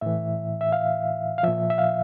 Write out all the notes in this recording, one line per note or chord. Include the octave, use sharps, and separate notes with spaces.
A2 E3 E5
E5
F5
F5
A#2 F3 E5
E5
F5